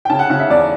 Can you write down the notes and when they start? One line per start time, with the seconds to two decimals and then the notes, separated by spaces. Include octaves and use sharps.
0.05 G5
0.10 C#3 A5
0.19 F#5
0.30 C#3 F#5
0.40 E5
0.50 E2 D5